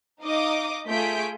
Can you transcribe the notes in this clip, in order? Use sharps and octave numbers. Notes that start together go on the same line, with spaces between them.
D#4 D#5 F5 D6 D#6
A3 F4 G#4 G6 B6 D7